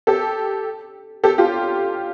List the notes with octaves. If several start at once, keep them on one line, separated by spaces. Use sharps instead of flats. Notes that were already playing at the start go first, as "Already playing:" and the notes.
G4 A4
G4 A4
F4 G4